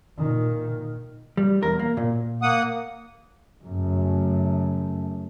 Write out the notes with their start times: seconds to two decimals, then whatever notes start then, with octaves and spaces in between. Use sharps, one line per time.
0.17 A#2 D#3
1.37 G3
1.63 E2 A#4
1.79 A#3
1.97 A#2
2.42 A#3 F#5 D#6
3.65 F#2 C#3 A3